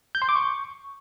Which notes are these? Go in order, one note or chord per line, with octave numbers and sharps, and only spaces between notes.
G6
C6
D6
C#6